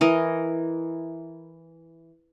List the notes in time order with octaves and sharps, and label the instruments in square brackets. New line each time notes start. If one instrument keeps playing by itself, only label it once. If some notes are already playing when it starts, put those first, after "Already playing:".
[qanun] E3 A#4 D#5